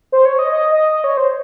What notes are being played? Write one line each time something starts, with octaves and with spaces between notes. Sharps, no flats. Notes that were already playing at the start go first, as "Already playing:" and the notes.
C5
C#5
D#5
D#5
D#5
D#5
C#5
C5